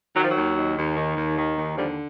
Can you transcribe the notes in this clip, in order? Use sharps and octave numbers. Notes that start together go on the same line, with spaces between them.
D#3 F#3
F3
F#3
D#2
D#3
D#2
D#3
D#2
D#3
D#2
D3 F3 G3